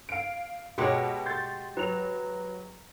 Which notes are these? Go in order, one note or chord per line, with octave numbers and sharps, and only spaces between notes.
F5 D7
B2 G#3 F#4 G4 C#5
C6 G6 A6
F#3 B4 F7